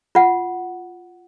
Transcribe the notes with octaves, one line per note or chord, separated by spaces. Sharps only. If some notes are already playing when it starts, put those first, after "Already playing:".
F4 F#5